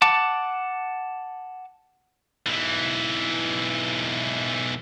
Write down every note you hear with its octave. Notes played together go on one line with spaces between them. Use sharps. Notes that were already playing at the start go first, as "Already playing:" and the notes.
F#5 A5 D6
B1 E3